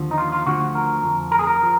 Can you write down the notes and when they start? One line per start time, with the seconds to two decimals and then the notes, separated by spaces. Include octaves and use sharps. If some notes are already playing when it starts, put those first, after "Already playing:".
Already playing: D#2 D3 F3
0.11 D#4
0.18 F4
0.32 F4
0.46 D2 D3 F3 F#4
0.75 A#4
1.03 F2 F3
1.32 A#4
1.39 G#4
1.47 A#4
1.63 F3